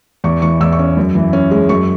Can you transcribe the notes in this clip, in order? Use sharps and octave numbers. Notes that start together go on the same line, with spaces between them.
E2 C#6
E3 C#6
E2 E6
C#6
C#4
F#2
E3
C#4
G#3
F#2 C#6